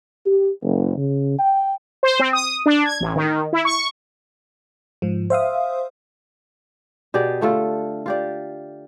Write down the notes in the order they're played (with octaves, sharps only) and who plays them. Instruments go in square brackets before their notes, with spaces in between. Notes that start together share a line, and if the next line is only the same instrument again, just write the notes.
[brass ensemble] G4
F#1
C#3
G5
[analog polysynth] C5
C4
D#6
D4
G#6
A1
D#3
E4
C#6
[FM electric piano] G#2 F3
C5 E5 F5 D#6
[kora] B2 G4 G#4 D5
D3 A3 F4 A4
F4 G4 D5